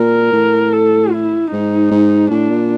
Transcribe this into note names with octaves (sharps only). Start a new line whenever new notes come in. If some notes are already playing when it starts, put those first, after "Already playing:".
Already playing: A#2 A#4
A2
A4
E4
G#2 D#4
G#2
A2 D4
A#2